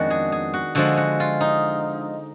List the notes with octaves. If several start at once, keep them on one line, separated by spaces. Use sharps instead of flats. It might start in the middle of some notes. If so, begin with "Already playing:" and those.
Already playing: F2 D#3 G#3 B3 D4 F#4
G#4
G#4
F#4
D3 F3 G#3 F#4
F#4
F4
D#4